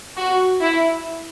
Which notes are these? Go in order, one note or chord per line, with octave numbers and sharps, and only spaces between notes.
F#4
E4